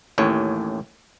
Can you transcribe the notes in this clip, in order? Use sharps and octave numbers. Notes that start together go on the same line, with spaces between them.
A1 D#2 A2 C#5